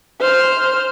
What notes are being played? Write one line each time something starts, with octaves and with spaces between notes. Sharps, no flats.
C5 F6